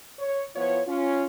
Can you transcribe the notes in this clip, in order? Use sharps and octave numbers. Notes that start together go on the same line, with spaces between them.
C#5
F3 B3 E4 F4 C#5
C#4 F4